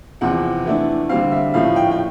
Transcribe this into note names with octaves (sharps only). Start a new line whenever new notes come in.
E2 C3 F3 F#5
E3 A3 D4
D3 G3 C4 F5
E5
A2 F3 A3 C#4 F5
G5
G5